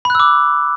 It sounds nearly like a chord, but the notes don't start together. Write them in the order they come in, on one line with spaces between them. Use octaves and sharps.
B5 F#6 E6 D6